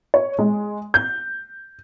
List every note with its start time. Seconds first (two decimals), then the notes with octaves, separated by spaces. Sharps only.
0.14 C#5
0.39 G#3
0.94 G6